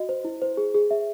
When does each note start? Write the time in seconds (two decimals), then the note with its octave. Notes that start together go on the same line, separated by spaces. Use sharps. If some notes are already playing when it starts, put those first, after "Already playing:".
Already playing: F#4 D#5
0.09 C5
0.24 E4
0.42 C5
0.57 G#4
0.74 G#4
0.91 E5